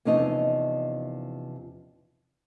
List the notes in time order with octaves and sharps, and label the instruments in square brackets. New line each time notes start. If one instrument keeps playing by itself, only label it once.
[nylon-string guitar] E2 C3 F3 C#4 D#4 D#5